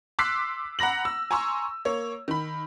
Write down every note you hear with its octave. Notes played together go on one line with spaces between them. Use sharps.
C6 D6 E6 F#6 B6 C7
F#5 A#5 B5 A#6 F#7
E6
G#5 A#5 C6 C#6 E6
A#3 C#5
D#3 B5